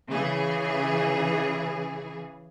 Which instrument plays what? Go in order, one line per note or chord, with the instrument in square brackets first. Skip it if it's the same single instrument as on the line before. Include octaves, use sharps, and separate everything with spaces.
[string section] C#3 E3 G#4